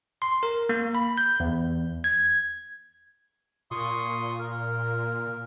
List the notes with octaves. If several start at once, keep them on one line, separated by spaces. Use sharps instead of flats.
C6
A#4
A#3
B5
G6
E2
G#6
A#2 C6 C#6 D#6
A#4